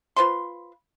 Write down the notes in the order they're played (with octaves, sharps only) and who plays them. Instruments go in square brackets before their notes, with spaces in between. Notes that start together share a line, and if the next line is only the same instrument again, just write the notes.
[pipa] F4 B4 C5 C6